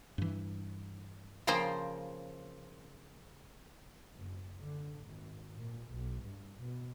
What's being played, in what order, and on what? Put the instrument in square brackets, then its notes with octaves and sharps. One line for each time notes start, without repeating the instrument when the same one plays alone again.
[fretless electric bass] G2 E3
[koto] C#3 F3 A#3 C5 G5
[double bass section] F#1
D3
G#1
A#2
B1
G2
B2